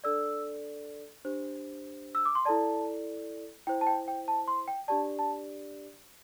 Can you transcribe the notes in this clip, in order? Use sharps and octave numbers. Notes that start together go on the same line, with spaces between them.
D4 A4 D5 E6
D4 G4 C5
E6
D6
C6
E4 A4 D5 A5
E4 C5 G5
A5
G5
G5
A5
C6
G5
D4 G4 D5 A5
A5